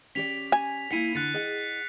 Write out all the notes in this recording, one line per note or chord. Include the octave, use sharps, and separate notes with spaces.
C#4 G4 D5 B6 F7
G#5
A#3 E4 F#5 B6 C7 D#7
D3 F#6 A6 C#7
G#4 D#5 F#5